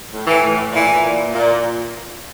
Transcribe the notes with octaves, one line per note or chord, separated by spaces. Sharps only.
A2
E3
A2
A#2 E3
A#2
A#2